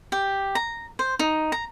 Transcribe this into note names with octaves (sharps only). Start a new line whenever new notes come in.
G4
A#5
C5
D#4
A#5